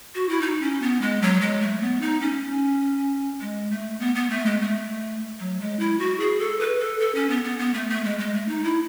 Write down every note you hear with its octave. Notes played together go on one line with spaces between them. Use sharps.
F#4
E4
D#4
C#4
B3
G#3
F#3
G#3
A3
B3
D#4
C#4
G#3
A3
B3
B3
A3
G#3
A3
F#3
G#3
E4
F#4
G#4
A4
B4
A4
A4
C#4
B3
B3
B3
A3
A3
G#3
G#3
A3
D#4
E4